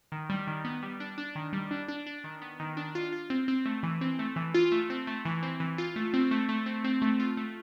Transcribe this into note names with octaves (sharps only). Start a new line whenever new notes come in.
D#3
G3
D#3
B3
G3
D4
D4
D#3
G3
D4
D4
D4
D#3
B3
D#3
D4
F4
F4
C4
C4
A3
E3
C4
A3
E3
F4
A3
C4
A3
E3
C4
E3
F4
A3
C4
A3
A3
C4
C4
A3
F4
A3